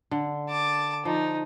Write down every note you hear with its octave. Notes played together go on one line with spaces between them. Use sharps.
D3
A5 D6
F3 D#4